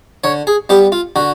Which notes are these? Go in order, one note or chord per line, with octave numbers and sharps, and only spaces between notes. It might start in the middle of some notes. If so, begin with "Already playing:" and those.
D3 C#5
G#4
G3 B3 G4
F4
D3 F#4